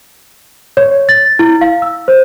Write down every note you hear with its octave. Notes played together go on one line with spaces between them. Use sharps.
C#5
A6
E4
F5
E6
C5